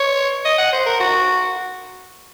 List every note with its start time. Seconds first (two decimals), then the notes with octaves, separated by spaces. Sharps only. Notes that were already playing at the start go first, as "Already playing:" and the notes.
Already playing: C#5
0.45 D#5
0.59 F#5
0.73 C5
0.86 A#4
1.00 F#4